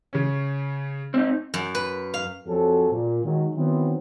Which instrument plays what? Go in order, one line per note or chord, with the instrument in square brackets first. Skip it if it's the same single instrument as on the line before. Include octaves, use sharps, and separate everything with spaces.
[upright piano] C#3 C#4
[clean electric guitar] C4 D#4
[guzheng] F#2
B4
F5
[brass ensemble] F2 F#3 C4 F#4 G#4 A4
A#2
D#3 F#3 G#3
D#3 E3 F#3 B3 C4